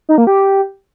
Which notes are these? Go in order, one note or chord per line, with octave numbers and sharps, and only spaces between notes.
D#4
A#3
G4